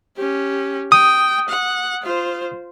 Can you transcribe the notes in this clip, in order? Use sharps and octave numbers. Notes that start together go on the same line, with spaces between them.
C#4 G4
G5 D#6
F#5
F4 C5